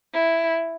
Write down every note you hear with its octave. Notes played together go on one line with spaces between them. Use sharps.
E4